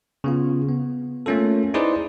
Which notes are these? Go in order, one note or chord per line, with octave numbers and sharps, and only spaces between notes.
C#3 B3 F4
B3
A3 A#3 C#4 F4 A4
D#4 E4 G#4 B4 C5 D5